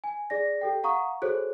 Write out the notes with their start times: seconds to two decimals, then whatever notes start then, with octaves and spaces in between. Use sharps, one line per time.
0.04 G#5
0.30 G#4 D5 A#6
0.61 G4 A4 G5
0.83 F5 F#5 A#5 C#6 D#6
1.22 F#4 G#4 A4 C5 C#5 F#6